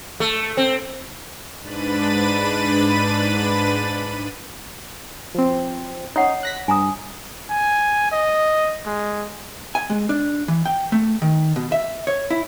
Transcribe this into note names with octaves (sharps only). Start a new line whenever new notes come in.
A3
C4
G#2 D4 B4 B5 A6 D#7
F3 C4
C#4 D#4 C#5 F#5
F#6 A#6 B6
G2 G#5 A#5 D#6
G#5
D#5
G#3
G#5
G#3
D4
E3
G5
A3
D#3
B2
E5
C#5
E4